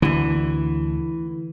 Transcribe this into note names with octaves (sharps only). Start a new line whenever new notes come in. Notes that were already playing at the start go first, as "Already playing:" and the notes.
D2 D3 E3